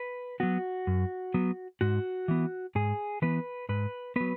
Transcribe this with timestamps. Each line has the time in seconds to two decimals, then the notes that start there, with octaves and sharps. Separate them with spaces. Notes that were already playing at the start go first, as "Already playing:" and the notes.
Already playing: B4
0.40 F#3 B3 F#4
0.87 F#2
1.34 F#3 B3
1.81 G#2 F#4
2.28 E3 B3
2.75 G#2 G#4
3.22 E3 B3 B4
3.69 G#2 B4
4.16 F#3 B3 B4